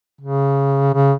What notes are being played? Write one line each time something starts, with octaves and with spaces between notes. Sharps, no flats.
C#3
C#3